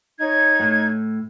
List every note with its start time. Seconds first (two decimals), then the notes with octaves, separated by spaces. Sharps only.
0.19 D#4 C#5 G#6
0.60 A2